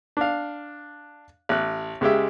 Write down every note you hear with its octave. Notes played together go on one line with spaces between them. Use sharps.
D4 F5
A1 F#6
C#2 G#3 G4 E5